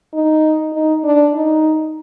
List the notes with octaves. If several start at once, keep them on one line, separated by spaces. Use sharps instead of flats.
D#4
D#4
D4
D#4